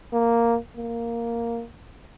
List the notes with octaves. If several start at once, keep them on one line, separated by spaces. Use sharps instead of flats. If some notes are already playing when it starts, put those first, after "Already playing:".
A#3
A#3